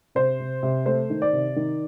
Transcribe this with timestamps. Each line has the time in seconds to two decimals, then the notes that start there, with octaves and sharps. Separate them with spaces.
0.15 C3 C5
0.40 C3
0.63 C3
0.86 A3 C5
1.10 D#3
1.22 D5
1.33 C3
1.56 D#3